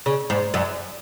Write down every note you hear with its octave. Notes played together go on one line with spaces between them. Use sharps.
C#3
G#2
F#2